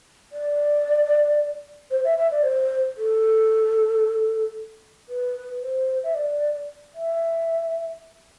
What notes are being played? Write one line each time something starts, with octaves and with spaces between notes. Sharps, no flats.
D5
C5
E5
E5
D5
C5
A4
B4
C5
E5
D5
E5